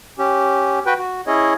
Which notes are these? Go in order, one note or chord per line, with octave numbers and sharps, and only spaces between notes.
C#4 G4
F#4 B4 G5
F#4
C#4 E4 G#4 C#5 D#5